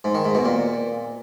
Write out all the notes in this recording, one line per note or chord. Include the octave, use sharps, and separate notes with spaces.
G#2
D#3
G#2
B2
A#2